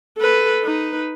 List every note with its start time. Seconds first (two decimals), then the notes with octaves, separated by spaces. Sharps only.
0.18 A4 B4
0.63 D#4 B4